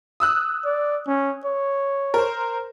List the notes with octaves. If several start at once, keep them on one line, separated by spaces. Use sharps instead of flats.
D#6 E6 F#6
D5
C#4
C#5
A#4 C5